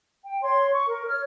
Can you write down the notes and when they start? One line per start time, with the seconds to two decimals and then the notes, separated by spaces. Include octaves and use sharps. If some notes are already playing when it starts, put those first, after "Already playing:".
0.25 G5
0.42 C#5 C6
0.72 C#6
0.88 A#4
1.07 C#5 F6